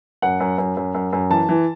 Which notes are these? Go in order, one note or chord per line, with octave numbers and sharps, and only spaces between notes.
F#2 F#5
F#2
F#2
F#2
F#2
F#2
E3 A5
E3